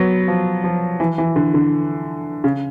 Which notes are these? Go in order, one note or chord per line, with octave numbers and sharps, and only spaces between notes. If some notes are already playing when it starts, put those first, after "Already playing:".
Already playing: F#3 B3
F3
F3
E3
E3
D3
D3
C#3